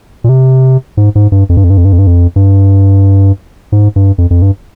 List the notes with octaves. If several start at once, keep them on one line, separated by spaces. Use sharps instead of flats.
A#2
C3
G#2
G#2
G2
F2
G2
F2
G2
F2
G2
F2
G2
F2
G2
G#2
G2
F2
F2
G2